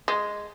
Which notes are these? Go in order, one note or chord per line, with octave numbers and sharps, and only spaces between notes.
G#3